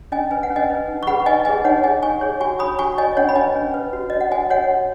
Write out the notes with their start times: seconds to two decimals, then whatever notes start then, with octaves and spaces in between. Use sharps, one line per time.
0.12 C#4 D#5 G#5
0.31 B4 G#5
0.43 F#5
0.50 C#4
0.56 D#5 G#5
0.70 B4
0.88 D#4
1.03 C#6
1.07 G#4 B4 F#5 B5
1.26 D#4 D#5 G#5
1.45 G#4 B4 D#5 G#5
1.64 D#4 C#5 F#5
1.84 G#4 C#5 D#5 G#5
2.02 D#4 G#5 C#6
2.21 G#4 C#5
2.40 F#4 G#5 C#6
2.59 C#5 B5 D#6
2.79 F#4 G#5 C#6
2.98 C#5 D#5 G#5
3.13 D#5
3.17 C#4 C#5 F#5
3.29 B5
3.36 B4 D#5 G#5
3.55 C#4
3.74 B4
3.93 F#4
4.10 C#5 D#5
4.21 F#5
4.31 F#4 D#5 G#5
4.50 C#5 F#5
4.69 F#4